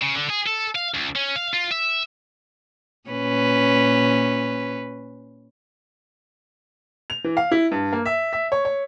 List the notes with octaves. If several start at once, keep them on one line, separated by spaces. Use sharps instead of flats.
C#3
D3
G#4
A4
F5
C#2
C#4
F5
F4
E5
A#2 C#4 B4
F7
E3
F5
E4
G2
A#3
E5
E5
C#5
C#5